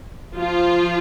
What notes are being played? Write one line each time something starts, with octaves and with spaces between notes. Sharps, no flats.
F3 F4